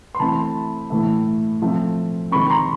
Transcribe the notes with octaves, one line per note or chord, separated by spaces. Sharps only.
C6
E3 A3 C4 A5 B5
A2 E3 A3
F3 A3 C4
D#3 G#3 C4 B5 C#6
A#5 C6